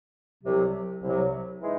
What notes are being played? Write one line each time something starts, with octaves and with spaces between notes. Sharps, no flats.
C2 C3 F#3
C2 C3 F#3
E3 G#3 D#4